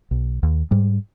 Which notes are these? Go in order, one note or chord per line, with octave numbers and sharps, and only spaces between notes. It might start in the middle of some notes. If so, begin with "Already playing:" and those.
B1
D#2
G#2 G3